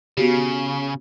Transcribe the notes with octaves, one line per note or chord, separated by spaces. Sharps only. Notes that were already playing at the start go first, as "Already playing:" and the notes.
C#3 B3 F#4 G4